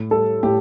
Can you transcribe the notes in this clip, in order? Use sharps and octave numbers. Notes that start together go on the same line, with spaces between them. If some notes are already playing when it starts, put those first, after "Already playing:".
Already playing: A2
G3 A4
A2 G4